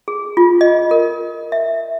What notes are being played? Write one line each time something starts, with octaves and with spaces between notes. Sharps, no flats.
G#4
F4
D#5
A#4
E5